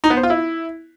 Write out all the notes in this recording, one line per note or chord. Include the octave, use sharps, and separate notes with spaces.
D#4
B3
C5
F4
E4